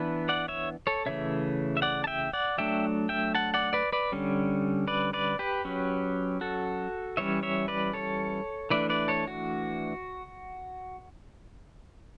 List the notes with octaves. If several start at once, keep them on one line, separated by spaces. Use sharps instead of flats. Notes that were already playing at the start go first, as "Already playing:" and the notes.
Already playing: E3 B3 D4 B4
D5 F#5
C#5 E5
A4 C#5
C#3 E3 A3 C#5 E5
E5
D5 F#5
A5
E5 G5
D5 F#5
F#3 A3 D4 E5 G5
E5 G5
F#5 A5
D5 F#5
B4 D5
B4 D5
D3 G3 C#4
B4 D5
B4 D5
G4 B4
F#3 C#4
F#4 A4
E3 G3 C#4 C#5 E5
C#5 E5
B4 D5
A4 C#5
E3 A3 D4 B4 D5
B4 D5
A4 C#5
F#4